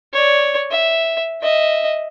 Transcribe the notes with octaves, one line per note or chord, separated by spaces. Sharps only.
C#5 D5
E5
D#5 E5